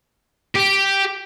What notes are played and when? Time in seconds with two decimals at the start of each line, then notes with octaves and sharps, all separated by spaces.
0.56 G4